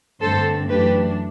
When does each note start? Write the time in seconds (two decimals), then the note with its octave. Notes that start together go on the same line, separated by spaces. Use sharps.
0.21 G2 D3 A3 C4 A4 C5
0.69 F#2 E3 A3 D4 G4 B4